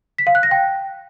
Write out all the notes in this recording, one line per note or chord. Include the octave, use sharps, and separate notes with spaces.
B6
F5
F#6
A#6
G5